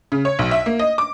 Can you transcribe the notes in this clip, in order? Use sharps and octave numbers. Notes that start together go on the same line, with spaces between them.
C#3
C#5
B1
E5
A#3
D#5
D6